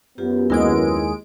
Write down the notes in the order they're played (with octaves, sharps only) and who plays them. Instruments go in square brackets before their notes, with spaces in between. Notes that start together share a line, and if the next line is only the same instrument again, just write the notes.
[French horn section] F#2 B3 [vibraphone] F4 G4
[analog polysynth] D#2 G#3 D7 [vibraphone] E4 A#4